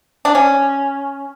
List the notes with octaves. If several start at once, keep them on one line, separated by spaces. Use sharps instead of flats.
D4
C#4